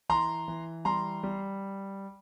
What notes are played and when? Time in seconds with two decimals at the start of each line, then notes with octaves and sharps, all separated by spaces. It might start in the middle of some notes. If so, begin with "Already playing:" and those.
0.09 E3 A#5 C6
0.48 E3
0.85 G3 A#5 C6
1.23 G3